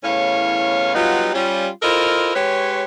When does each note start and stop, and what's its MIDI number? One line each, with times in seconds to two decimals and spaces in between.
0.04 0.94 40
0.04 0.94 45
0.04 0.94 61
0.04 0.94 73
0.04 0.94 77
0.95 1.33 54
0.95 1.33 55
0.95 1.33 59
0.95 1.33 63
0.95 1.33 65
1.34 1.68 55
1.34 1.68 61
1.34 1.68 65
1.83 2.32 64
1.83 2.32 65
1.83 2.32 69
1.83 2.32 70
1.83 2.32 72
1.83 2.32 75
2.36 2.83 56
2.36 2.83 67
2.36 2.83 71
2.36 2.83 73